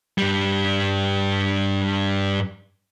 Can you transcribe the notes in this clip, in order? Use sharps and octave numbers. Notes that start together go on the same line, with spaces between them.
G2 G3